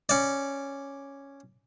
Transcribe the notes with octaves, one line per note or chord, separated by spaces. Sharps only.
C#4 D5